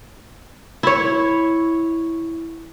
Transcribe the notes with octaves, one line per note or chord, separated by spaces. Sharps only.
E4 C#5